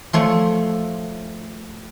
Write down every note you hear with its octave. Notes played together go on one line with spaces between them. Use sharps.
F3 A3 C#5